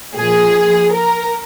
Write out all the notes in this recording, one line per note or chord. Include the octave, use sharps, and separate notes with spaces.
A#2 F3 G#4
A#4